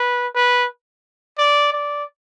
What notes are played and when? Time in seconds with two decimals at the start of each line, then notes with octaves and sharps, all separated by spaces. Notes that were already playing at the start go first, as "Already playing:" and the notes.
Already playing: B4
0.35 B4
1.38 D5
1.73 D5